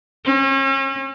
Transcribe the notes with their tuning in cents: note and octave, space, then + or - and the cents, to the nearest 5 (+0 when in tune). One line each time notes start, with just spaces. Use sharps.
C#4 -40